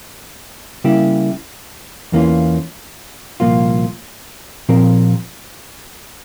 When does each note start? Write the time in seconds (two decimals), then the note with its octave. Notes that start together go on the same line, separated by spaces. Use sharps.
0.84 C#3 G3 A#3 E4 G4
2.12 E2 E3 A#3 C#4 F4
3.40 C2 A#2 F3 A#3 F4
4.69 A#2 F3 C4 G4 A#4